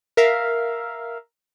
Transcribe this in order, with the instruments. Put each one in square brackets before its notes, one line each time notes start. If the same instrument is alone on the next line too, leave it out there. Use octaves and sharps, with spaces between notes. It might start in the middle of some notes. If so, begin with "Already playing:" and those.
[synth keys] A#4 E5 F5